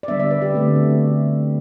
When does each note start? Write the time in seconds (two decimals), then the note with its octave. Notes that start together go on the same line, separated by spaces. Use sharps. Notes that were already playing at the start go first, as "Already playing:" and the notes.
0.03 D5
0.08 D3 G3 B3 D4 E5
0.20 D5
0.31 B4
0.42 G4
0.54 D3 A3 C4
0.76 F#4